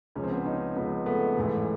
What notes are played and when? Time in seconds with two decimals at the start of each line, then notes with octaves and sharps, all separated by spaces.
0.15 C#2 C#3 F3 C#4
0.23 C4
0.30 B3 C#4
0.46 C#4 D#4
0.76 C#2 C#3 F3 B3 C#4
1.06 A3 B3
1.36 A1 G#2 E3 A3